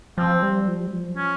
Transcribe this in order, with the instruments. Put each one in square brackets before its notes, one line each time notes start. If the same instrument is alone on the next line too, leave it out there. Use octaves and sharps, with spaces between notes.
[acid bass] F3 [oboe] C4
[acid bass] G3
F3
G3
F3
[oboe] C#4